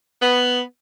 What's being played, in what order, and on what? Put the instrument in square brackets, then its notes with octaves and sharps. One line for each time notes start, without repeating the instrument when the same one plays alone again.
[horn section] B3